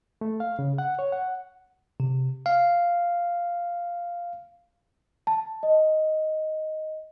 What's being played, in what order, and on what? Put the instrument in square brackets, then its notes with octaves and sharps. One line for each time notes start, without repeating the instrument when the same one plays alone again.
[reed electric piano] A3
F5
C#3
F#5
C#5
F#5
[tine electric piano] C3
F5
[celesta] A5
D#5